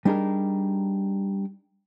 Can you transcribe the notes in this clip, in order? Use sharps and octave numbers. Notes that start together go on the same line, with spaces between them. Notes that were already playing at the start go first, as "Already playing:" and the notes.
G3 D4 D#4 G#4 A#4